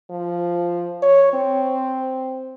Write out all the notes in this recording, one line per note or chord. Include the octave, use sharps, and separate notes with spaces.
F3
C#5
C4